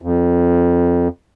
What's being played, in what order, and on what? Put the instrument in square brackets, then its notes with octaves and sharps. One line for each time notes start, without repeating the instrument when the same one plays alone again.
[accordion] F2